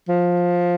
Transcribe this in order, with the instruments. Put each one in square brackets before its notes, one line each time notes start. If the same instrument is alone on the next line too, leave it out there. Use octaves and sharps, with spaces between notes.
[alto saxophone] F3